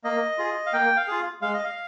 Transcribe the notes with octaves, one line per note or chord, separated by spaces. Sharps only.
A#3 D#5
F4 G#4
F5
A#3 G5
F5
F4 G#4
G#3 F5
D#5
F5